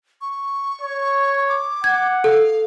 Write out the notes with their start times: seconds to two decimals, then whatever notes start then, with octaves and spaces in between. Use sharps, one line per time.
0.21 C#6
0.81 C#5
1.49 D6
1.84 F#5 G#6
2.24 A4 F5